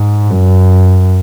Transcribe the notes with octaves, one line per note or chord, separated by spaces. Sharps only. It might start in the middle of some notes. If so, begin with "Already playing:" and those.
Already playing: G#2
F#2